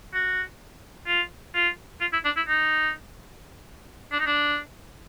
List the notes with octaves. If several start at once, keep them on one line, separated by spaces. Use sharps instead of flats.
F#4
F4
F4
F4
E4
D4
E4
D#4
D4
D#4
D4